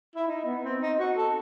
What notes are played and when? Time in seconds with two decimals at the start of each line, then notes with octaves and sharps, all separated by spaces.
0.16 E4
0.28 D#4
0.45 B3
0.63 C4
0.81 D#4
0.99 F#4
1.16 A4